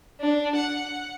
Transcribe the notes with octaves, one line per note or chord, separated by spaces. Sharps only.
D4
F#5